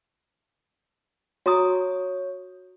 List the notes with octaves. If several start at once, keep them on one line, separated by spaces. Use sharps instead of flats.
F#4 C#5 A#5 D#6